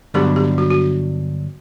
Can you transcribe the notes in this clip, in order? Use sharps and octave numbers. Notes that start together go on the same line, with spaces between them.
G2 D3 F#3 B3 D4 G4
G4
F#4
F#4